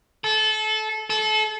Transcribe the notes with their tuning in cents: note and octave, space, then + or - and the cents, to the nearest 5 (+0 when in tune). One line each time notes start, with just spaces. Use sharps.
A4 -25
A4 -30